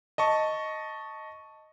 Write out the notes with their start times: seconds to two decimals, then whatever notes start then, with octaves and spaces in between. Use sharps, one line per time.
0.18 D#5 A5 C#6